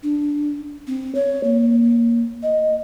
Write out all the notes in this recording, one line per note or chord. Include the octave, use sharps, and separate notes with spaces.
D4
C4
C#5
A#3
D#5